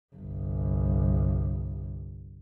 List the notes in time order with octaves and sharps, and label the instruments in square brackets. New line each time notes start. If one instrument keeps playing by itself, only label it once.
[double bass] G1 C2